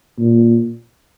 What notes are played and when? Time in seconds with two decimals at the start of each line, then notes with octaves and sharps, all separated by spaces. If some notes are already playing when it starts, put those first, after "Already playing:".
0.19 A#2